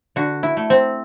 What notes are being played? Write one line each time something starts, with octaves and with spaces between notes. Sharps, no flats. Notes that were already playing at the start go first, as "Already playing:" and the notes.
D3 F#4
E4
A3
C4